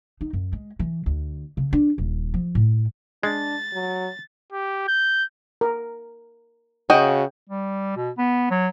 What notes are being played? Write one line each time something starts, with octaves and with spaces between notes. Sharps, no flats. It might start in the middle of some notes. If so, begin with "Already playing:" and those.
D#4
F#2
G#3
E3
D2
C#3
D4
D#1
F3
A2
G#3 D4 A6
F#3
G4
G6
A#4
C#3 F#4 D#5 G5
G3
B2
B3
F#3